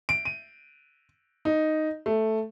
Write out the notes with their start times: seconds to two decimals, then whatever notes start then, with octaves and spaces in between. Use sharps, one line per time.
0.09 D7
0.25 D#7
1.45 D#4
2.06 A3